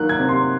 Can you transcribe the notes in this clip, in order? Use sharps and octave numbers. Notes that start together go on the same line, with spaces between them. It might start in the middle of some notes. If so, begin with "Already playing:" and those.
Already playing: D#3 F#3 A#3 F#6
G#6
C3
C6